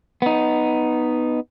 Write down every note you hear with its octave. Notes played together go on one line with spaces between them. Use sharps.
B3 D#4